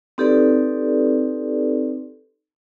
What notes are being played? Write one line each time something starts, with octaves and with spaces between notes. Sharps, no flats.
C4 D#4 G4 A4 B4 D5